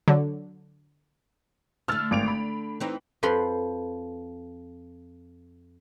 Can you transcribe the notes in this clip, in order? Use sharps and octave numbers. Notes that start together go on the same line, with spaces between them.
D3 F#3
D3 A3 E6 F6 A6
G#1 D7 F7
B5
E3 C4 D#4
F2 F3 B4 B5 C6